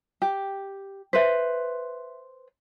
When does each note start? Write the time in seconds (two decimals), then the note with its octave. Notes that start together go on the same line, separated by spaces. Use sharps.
0.22 G4
1.13 B4 C5 E5 B6